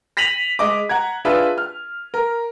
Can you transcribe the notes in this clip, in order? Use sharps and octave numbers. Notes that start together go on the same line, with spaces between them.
A#6 B6 D#7 F7 F#7
G#3 D#5 D6
F#5 A#5 G#6
D4 F4 G#4 B4 E5
F6
A#4